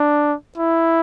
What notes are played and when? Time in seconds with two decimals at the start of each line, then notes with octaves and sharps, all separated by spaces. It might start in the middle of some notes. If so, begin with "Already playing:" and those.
Already playing: D4
0.58 E4